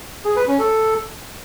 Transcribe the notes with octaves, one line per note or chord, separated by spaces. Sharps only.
G#4
B4
C#4
A4